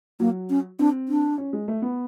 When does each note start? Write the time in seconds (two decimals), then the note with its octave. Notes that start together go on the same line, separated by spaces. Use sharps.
0.20 F#3 A#3
0.50 C#4
0.79 C4 D4
1.09 D4
1.38 C#4
1.53 G#3
1.68 A3
1.82 B3